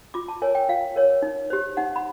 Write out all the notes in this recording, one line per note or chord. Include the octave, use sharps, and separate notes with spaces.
F4 D6
A5
A#4 C#5 G#5
G5
F4 F5
A#4 C#5
D#4
G4 C5
D#4 F#5
B5